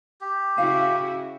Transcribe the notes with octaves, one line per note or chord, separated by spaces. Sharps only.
G4
C#3 E4 F#4 F5